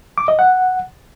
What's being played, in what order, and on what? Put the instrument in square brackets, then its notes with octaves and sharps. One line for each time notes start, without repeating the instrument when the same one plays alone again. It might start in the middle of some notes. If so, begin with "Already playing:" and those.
[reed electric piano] D6
D#5
F#5